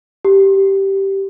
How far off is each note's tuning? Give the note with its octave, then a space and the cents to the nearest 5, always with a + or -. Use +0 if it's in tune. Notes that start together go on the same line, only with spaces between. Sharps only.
G4 -10